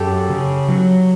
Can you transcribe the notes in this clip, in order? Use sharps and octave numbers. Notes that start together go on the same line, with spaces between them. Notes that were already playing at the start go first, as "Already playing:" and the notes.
Already playing: F#2 G4 A4
C#3
F#3